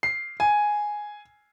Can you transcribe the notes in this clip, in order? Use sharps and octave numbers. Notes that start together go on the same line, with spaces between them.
C7
G#5